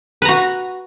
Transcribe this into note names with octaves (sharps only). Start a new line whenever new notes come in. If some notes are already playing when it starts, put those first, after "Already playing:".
F#4 B4 A#5